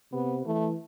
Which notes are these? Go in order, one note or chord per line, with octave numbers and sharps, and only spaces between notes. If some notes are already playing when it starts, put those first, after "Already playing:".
C3 B3
E3 A3